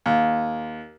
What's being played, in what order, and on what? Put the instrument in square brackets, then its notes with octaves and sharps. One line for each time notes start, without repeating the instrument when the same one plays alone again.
[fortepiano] D#2